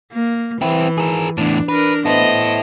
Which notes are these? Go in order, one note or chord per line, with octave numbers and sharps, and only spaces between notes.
A#3
E3 C4 E4
G#4 A#4
E2 A2 D4
D4 A#4 B4
B3 E4 A4 C5 D#5